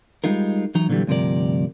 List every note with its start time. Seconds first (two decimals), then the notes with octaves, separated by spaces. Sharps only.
0.24 G3 G#3 D#4 F4 A#4
0.75 E3 F#3 D#4 A#5
0.89 A#2 D3 E3 F#3 G3
1.07 D2 G2 C3 F3 A#4 D5